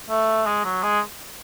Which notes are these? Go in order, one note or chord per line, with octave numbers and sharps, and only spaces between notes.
A3
G#3
F#3
G#3